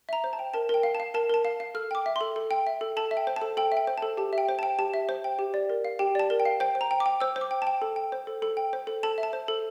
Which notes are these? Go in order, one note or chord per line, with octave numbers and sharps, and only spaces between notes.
E5 A#5
C5
A5
G5
A#4 A5
A#4 G5
F5
A5
F5
A#4 A5
A#4 A5
F5
F5
A4 F6
G5 D6
E5
A4 C6
A4
G5
E5
A4
A4 A5
E5
G5
C5
A5
A4
A4 G5
E5
G5
C5
A4 A5
G4 A5
E5
G5
C5
G5 A5
G4 A5
E5
C5
G5
G4
D5
A#4
F5
G4 G5
D5 A5
A#4
G5
F5
C5 G5
C5
A#5
G5
D6
G5
C5 E6
C5
D6
G5
G5 A5
A4
G5
C5
A4
A4
G5
C5
A4
A4 A5
E5
A5
C5
A4